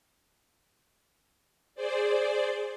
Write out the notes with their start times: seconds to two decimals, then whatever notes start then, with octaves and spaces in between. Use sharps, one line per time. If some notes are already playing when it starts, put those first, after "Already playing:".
1.75 G#4 C5 D5